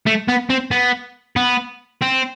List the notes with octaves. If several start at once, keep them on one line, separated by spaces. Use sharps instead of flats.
A3
B3
C4
B3
B3
C4